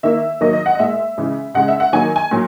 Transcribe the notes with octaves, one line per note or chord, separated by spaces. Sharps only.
D#3 A#3 E5
D#3 F#3 A#3 D#5
D#5
F#5
D#5
A#2 G#3 E5
C#3 E3 G#3
C#3 G#3 F#5
E5
F#5
D#3 F#3 A#3 G#5
G#5
A#2 F#3